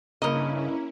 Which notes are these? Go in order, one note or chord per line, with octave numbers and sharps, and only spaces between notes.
G2 C#3 A#3 C#4 E4 D#5